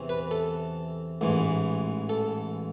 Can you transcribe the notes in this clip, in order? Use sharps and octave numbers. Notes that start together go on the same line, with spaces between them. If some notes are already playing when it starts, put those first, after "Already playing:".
Already playing: E2 C3 E3
B4
A4
A1 G#2 E3
A4